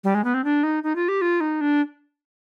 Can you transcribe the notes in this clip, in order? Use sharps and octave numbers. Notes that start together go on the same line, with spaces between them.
G3
G#3
B3
C4
D4
D#4
D#4
F4
G4
F4
D#4
D4